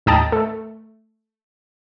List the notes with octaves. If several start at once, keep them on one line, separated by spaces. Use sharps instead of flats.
A1 D#2 D#5 G5 A5 A#5
A3